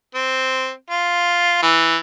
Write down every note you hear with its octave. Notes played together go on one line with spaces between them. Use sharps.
C4
F4
E3